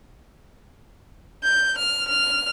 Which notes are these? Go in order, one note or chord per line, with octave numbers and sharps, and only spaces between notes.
G6
F6
F6